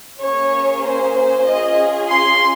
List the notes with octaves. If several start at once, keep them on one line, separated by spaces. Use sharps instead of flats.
A#3 C#4 G#4 C#5
C5
C5
C#4 F4 G#4 D#5
C6